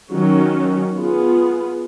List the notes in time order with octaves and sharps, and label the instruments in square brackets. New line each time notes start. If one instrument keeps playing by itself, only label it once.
[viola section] D#3 F#3 C#4
B3 F4 G#4